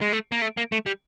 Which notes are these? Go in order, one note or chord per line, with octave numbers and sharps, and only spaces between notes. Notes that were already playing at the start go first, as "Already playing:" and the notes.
G#3
A3
A#3
A3
A#3
A3
G3